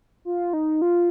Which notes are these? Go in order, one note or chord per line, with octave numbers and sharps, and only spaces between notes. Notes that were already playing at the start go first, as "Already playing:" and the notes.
F4
D#4
F4